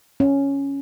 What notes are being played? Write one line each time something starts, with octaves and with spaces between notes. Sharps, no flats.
C#4